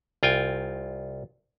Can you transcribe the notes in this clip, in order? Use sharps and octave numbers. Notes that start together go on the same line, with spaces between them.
C2 F4 G5 G#5